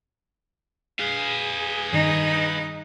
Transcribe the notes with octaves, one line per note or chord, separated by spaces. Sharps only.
G#4 B4 F5
G2 D#3 D#4